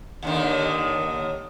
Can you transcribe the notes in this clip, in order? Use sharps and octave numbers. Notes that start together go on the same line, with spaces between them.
D#2 D3 D#3